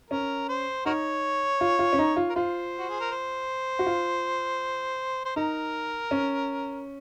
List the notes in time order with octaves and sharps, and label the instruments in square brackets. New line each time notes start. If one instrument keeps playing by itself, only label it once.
[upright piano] C#4 [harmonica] A#4
[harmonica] C5
[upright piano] D#4 [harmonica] F#4 A#4 C#5
[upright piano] F4
F4
C#4
D#4
F4
[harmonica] A#4
[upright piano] F4 [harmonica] C5
[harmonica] F#4
G#4
A#4
C5
[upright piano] F#4
F4
[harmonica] C5
[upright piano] D#4 [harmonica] A#4
[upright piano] C#4